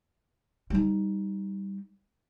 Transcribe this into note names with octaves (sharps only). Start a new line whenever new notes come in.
G3 D#4